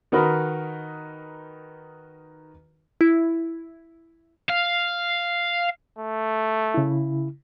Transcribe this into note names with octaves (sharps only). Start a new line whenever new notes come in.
D#3 D#4 F#4 A#4 B4 B5
E4
F5
A3
C#3 E4